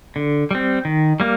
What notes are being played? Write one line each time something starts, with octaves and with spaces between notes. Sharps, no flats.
D3
G3 C4
D#3
G3 A#3